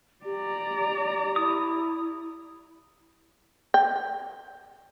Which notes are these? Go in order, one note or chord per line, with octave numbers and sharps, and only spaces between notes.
G4 D5 A#5
E4 D#6
G5